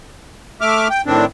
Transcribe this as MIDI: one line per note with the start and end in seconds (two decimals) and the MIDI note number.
0.61 0.88 57
0.61 0.88 76
0.61 0.88 86
0.61 0.88 89
0.90 1.02 79
1.06 1.25 45
1.06 1.25 51
1.06 1.25 60
1.06 1.25 62